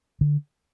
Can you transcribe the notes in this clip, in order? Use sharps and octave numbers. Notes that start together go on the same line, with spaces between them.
D3